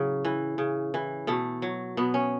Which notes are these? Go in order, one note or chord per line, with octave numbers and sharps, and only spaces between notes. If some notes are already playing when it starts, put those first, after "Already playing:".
Already playing: A2 C#3 F#3
E3
C#3
E3
B2 A3
F#3
B2 B3
C#4